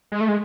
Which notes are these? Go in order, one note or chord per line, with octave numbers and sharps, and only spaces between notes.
G#3
A3
G#3